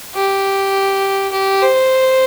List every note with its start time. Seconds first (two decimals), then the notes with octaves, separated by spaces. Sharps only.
0.15 G4
1.32 G4
1.62 C5